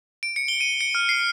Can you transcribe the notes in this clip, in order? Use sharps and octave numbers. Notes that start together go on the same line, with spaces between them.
D7
C#7
G7
D#7
C#7
F6
C7